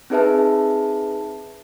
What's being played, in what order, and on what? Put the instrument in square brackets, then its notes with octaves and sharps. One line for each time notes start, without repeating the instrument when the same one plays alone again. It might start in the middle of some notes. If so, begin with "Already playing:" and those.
[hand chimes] C4 D#4 G#4 B4 E5 A5